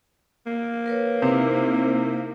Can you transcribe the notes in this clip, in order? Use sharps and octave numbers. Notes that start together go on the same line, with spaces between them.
A#3
A#4 B4 C#5
C3 C4 D#4 E4